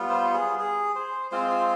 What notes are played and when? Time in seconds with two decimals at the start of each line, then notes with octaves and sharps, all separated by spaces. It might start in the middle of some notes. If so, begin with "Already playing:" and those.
Already playing: G3 B3 F4
0.09 C5
0.34 G#4
0.59 G#4
0.96 C5
1.31 G#3 C4 F4 C5
1.51 C5